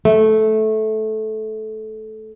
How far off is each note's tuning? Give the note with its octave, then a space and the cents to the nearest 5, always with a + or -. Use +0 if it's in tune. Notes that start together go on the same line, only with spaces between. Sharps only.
A3 -15